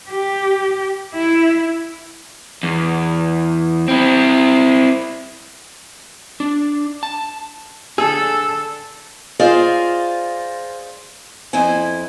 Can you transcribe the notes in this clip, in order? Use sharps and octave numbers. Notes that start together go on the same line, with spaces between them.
G4
E4
E2
C4 E4
D4
A5
D3 G#4 A4 E6
F4 G#4 C5 D5 D#5 F5
F2 E4 C5 G#5